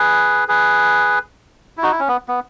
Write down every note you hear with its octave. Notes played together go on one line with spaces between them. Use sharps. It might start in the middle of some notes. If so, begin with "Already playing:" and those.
Already playing: G#4 B4
G#4 B4
E4
D#4 F#4
E4
C#4
B3
B3